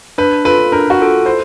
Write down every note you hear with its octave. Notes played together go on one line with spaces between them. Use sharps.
D4 B4
F4 A4 B4
D4 A#4
F#4
F4 A4
E4 C5